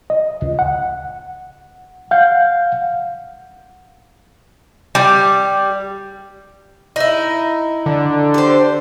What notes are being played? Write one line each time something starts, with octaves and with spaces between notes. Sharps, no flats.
D#5
C#2
F#5
F5 F#5 G6
G3
D#4 E4
D3
G4 C5